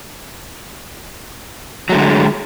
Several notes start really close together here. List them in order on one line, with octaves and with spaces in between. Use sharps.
F#3 A3 D3 G#3